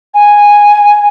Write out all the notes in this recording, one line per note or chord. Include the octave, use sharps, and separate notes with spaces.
G#5